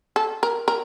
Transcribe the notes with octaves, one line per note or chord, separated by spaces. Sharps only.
A4
A#4
A#4